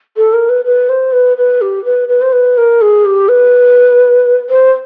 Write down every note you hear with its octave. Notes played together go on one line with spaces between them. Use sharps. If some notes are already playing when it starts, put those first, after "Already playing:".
A4
A#4
B4
B4
C5
B4
B4
G4
B4
B4
C5
B4
A#4
G#4
G4
B4
C5